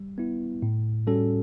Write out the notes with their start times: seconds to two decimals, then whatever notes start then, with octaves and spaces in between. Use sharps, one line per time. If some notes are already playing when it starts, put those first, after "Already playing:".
Already playing: G3
0.18 B3 E4
0.62 A2
1.07 G3 C#4 F#4 A4